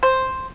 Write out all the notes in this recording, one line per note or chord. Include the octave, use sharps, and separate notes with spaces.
C5